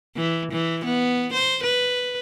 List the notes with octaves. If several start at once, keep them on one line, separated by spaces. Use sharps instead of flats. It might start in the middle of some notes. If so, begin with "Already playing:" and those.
E3
E3
B3
C5
B4